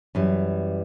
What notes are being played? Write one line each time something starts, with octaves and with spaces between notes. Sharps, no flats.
F#2 E3 G3